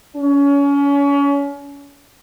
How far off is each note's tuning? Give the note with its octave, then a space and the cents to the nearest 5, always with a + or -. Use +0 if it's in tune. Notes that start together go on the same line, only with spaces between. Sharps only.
C#4 +30